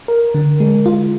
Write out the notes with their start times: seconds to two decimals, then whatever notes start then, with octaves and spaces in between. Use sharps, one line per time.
0.08 A#4
0.34 D3
0.60 G#3
0.86 F4